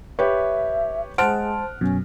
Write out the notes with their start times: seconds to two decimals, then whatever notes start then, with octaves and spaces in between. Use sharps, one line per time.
0.19 G4 B4 C#5 E5
1.18 G#3 C5 F#5 A5 F6 D7
1.81 F#2 B2 C#4